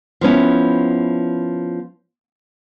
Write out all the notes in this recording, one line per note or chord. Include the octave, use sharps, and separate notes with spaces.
F3 B3 C#4 E4